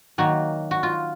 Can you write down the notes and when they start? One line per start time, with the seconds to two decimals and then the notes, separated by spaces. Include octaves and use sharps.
0.18 D#3 F#3 A#3 F#4
0.71 F#4
0.83 F4